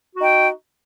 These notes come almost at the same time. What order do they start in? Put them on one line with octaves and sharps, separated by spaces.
F#4 D#4 G5